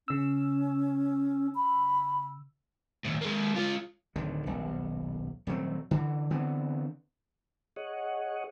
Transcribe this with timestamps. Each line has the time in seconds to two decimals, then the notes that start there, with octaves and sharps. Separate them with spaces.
0.08 C#3 C#4 E6
1.55 B5
3.05 D#2 A2
3.21 G#3 A#3
3.54 G#3 F4
4.16 D1 D3 D#3
4.46 D#1 B1
5.47 D#1 F#3 A3 C4
5.91 D3 E3
6.30 D3 E3 B3 C4
7.76 G#4 C#5 D#5 F#5